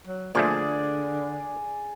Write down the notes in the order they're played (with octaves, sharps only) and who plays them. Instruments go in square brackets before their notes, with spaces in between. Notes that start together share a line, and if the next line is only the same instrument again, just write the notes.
[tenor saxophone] F#3
[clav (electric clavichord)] A#2 F3 A3 [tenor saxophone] D3 [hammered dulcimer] G#4 D5